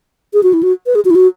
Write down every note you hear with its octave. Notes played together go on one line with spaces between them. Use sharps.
G#4
F#4
E4
F#4
B4
G#4
F#4
E4
F#4